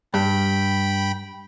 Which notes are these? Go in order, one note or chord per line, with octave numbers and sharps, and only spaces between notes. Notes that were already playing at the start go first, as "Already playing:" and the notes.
G2 G5 B5